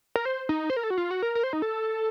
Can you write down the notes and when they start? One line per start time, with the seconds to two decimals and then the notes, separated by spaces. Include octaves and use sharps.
0.16 A#4
0.25 C5
0.49 D#4
0.70 C5
0.77 A#4
0.83 A4
0.90 F#4
0.98 F4
1.11 F#4
1.22 A#4
1.35 A#4
1.43 C5
1.53 D#4
1.62 A4